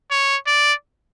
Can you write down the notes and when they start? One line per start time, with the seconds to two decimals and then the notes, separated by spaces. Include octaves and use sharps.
0.11 C#5
0.47 D5